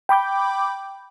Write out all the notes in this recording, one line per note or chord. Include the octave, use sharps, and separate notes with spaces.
G5 B5 D6 G6